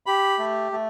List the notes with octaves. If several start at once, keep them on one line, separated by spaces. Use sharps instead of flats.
G4 B5
A3
A3